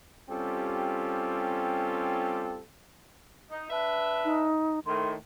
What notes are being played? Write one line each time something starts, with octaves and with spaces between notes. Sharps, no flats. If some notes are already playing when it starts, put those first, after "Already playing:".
G3 C4 C#4 F4 G4 A4
D#4
D4 B4 E5
D#4
A2 D#3 C6